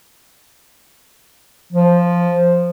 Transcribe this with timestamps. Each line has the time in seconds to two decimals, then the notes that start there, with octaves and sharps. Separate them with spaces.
1.72 F3